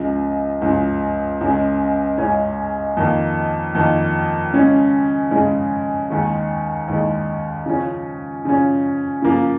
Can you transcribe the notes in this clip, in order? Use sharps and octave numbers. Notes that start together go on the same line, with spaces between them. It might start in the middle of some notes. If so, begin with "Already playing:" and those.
Already playing: C#2 C#3 F3
C#2 C#3 F3
C#2 C#3 G#3 C#4
C#2 C#3 G#3 C#4
F2 D#3 A#3
F2 D#3 A#3
C#3 G#3 C#4
C#3 G#3 C#4
D#2 D#3 G#3
D#2 D#3 G#3
C#3 F3 C#4
C#3 F3 C#4
C#3 F3 A#3